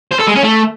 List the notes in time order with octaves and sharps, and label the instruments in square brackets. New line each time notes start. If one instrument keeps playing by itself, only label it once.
[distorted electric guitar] C5
A4
G#3
C#4
A3